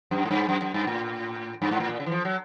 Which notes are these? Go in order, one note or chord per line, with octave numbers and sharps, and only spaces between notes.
F#2
G#2
G2
F#2
F#2
G2
A2
G2
G#2
A2
A#2
C#3
E3
F3
F#3